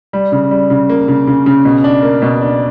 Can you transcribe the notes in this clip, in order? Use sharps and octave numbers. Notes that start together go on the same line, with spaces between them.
G3
C#3
G3
C#3
A#3
C#3
C#3
C#3
B2
D4
A#3
B2
D4